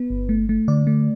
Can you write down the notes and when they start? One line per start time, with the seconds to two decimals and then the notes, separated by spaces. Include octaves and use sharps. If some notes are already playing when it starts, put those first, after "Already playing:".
Already playing: B3 B4
0.10 G1
0.29 A3
0.49 A3
0.68 D3 D5
0.87 A3